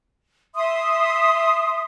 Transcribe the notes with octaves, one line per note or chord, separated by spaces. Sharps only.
E5 C6 D#6